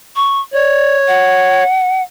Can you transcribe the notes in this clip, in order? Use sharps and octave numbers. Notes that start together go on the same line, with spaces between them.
C#6
C#5 D5
F#5